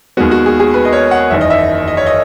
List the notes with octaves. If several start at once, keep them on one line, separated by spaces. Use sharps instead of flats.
D#2 D#3 G#3 B3 F#4
F#4
G#4
G#4
B4
D#5
C#5
F#5
F#1 E2 D#3 E5
D#5
E5
D#5
C#5
D#5